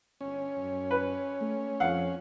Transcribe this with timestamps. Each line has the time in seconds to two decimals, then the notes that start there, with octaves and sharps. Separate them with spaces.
0.21 G1 C#4
0.57 F#2
0.91 B4
1.41 A3
1.80 F2 F5 F#5